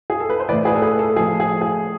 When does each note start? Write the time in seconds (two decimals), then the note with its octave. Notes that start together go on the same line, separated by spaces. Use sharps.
0.10 G#4
0.20 A4
0.30 B4
0.40 C5
0.49 A2 E3 B4 D5
0.65 G#4 B4
0.76 A4
0.82 G#4 B4
0.99 A4
1.16 A2 F3 G#4
1.40 G#4
1.61 G#4